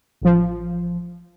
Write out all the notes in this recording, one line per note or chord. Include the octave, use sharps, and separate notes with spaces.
A1 F3